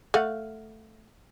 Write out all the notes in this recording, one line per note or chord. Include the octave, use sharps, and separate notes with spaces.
A3 F5 F#5